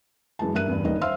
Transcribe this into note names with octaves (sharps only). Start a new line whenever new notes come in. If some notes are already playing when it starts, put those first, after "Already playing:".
F#2 E3 G#3 A5
G2 A#3 E5 F#6 D#7
E2 G2
D#1 G2 D#3 D#5
C5 E5 F5 C6 E6 F6